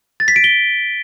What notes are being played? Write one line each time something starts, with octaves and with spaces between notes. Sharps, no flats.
A6
B6
D7
G7